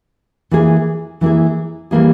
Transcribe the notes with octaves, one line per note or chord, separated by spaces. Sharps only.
E3 A#3 E4 G#4
E3 A#3 E4 G#4
E3 G3 A#3 E4 G#4